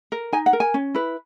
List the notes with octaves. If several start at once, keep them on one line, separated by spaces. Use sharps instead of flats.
A#4
D#4 G#5
F#5
A#4
G#5
C#4
E4 B4